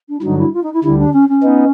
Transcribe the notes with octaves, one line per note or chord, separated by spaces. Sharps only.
D4
E4
G2 D3 F#3 D#4
E4
F4
D#4
E4
D2 D3 G3 E4
D4
C#4
C#4
B3 D#4